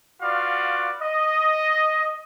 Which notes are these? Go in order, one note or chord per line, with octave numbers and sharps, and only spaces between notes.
F4 F#4 B4 D5 F5
D#5